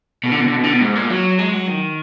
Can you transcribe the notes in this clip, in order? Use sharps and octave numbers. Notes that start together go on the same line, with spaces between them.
B2
D3
B2
D3
B2
D3
B2
G#2
A#2
F#3
G#3
F#3
D#3